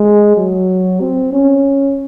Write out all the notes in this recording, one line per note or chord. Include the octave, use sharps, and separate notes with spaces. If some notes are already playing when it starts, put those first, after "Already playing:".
Already playing: G#3
F#3
C4
C#4